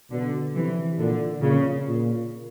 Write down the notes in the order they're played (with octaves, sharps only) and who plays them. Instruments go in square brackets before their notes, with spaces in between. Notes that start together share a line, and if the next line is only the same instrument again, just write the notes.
[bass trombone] B2 [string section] D3
[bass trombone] C3 [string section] E3
[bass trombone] A#2 [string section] D3
[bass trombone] A#2 [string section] C#3
[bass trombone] A#2